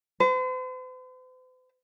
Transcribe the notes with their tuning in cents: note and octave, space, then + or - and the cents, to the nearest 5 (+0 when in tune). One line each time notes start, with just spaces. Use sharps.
C5 -45